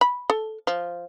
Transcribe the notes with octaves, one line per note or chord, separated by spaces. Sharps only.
B5
A4
F3